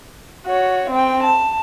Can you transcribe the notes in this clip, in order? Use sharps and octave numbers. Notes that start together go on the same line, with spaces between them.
F#4 C#5
C4 G5
A5